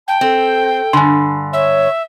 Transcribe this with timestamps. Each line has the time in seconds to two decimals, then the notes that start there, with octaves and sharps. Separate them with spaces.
0.08 G5 A5
0.21 C4 A4
0.93 G2 D3 G#5 B5 C6
1.53 C#5 E5